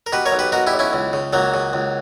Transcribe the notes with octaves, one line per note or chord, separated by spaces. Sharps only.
A#4
B2 G4 B4
A#4 C#5
B1
G4 B4
B2 F#4 A#4
E4 G4
B1
C#4 E4
C#2
C#3
C#2 F#3 A#3
C#3
C#2